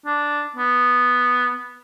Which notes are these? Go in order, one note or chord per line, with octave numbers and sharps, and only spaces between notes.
D4
B3